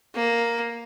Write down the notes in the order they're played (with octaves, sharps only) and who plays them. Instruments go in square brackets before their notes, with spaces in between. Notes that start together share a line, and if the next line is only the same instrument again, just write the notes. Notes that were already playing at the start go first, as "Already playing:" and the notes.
[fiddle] A#3